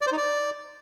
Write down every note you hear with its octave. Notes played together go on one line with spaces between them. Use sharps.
D5
C5
D#4
D5